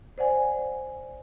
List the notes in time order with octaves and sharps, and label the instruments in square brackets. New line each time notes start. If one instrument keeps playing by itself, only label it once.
[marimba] C5 D5 F#5 G#5